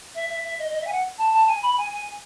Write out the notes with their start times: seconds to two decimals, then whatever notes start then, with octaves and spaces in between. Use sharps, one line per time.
0.15 E5
0.29 E5
0.44 E5
0.59 D#5
0.70 D#5
0.81 E5
0.87 G#5
0.92 F#5
1.18 A5
1.33 A5
1.47 G#5
1.62 B5
1.77 G#5
1.92 G#5